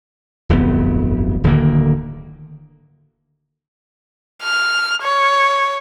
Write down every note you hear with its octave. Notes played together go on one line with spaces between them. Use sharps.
D1 G1 F2 B3
D1 D3 D#3 A#3
F6
C#5